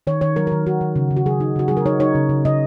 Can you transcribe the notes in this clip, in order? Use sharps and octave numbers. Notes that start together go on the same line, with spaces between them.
D#3 C#5
D#3 C#5
F#3 A#4
A#4
D#3
D#3 F#4
D#3
C#3
C#3
F#4
F#3 G#4
D#4
C#3 F#4
F#3 G#4
A#4
D#4 C#5
D#4 C#5
C#3
C#3
C#3 D#5